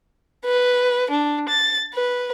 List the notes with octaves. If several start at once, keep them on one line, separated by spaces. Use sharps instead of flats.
B4
D4
A6
B4